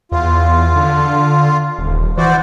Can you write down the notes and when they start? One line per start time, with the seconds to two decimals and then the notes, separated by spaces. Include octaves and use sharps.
0.12 E2 F4
0.76 D3
1.78 D#1
2.17 E3 F#4 C5 D5